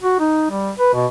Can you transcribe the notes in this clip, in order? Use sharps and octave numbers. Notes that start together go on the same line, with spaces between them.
F#4
D#4
G3
B4
B2